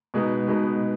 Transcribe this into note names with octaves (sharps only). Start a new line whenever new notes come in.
B2 G#3 B3 D#4
B2 G#3 B3 D#4